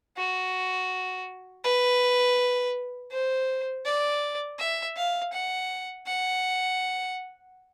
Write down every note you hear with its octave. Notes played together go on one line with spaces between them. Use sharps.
F#4
B4
C5
D5
E5
F5
F#5
F#5